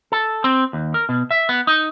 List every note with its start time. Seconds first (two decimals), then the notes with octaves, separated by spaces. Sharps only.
0.12 A4
0.44 C4
0.73 D#2
0.94 A#4
1.09 B2
1.31 E5
1.49 B3
1.67 D#4